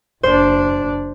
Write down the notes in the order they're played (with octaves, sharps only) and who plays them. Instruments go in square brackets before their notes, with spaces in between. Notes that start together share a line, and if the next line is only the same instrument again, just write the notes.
[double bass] F#1 D4 [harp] C5